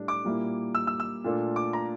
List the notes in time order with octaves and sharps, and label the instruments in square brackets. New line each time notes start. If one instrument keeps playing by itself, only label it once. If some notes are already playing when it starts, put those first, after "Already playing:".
Already playing: [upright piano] A2 G3 D4
[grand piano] D6
[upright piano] A#2 G3 A#3 E4
[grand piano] E6
E6
E6
[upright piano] A#2 A3 D4 F4 A4
[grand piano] D6
A#5